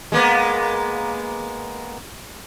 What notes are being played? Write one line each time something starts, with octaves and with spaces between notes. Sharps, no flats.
G#3 A#3 B3